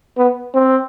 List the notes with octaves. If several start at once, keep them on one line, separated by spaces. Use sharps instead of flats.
B3
C4